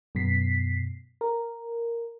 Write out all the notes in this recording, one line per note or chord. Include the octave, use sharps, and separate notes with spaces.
F#2 B2 B6 C7
A#4